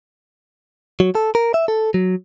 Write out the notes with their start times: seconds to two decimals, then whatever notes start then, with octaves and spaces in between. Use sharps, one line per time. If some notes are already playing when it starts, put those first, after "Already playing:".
1.00 F#3
1.15 A4
1.35 A#4
1.54 E5
1.68 A4
1.94 F#3